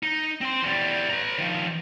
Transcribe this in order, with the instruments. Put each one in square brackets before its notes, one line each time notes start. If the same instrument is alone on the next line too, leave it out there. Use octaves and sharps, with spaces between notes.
[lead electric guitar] D#4
C4 C6
E2 G3
B4 A#5
D#3 F3